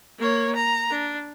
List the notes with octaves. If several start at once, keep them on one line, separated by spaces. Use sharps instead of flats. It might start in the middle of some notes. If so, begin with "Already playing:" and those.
A#3 C#5
A#5
D4